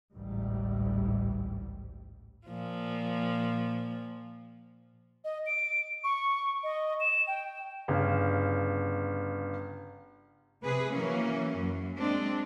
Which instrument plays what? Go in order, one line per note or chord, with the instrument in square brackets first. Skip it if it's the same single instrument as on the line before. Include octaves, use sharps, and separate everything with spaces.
[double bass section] A1 D2 G#2 G3
[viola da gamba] A#2 F3
[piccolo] D#5
D7
C#6
D#5
E7
G5
[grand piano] G1 C#3
[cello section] C3 G#4 B4
E3 F#3 A#3 C#4
F#2
G#3 C4 D4